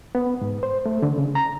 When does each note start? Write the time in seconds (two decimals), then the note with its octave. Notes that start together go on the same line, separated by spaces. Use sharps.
0.15 B3
0.41 G#2
0.63 C5
0.86 A3
1.02 D3
1.18 C#3
1.35 A#5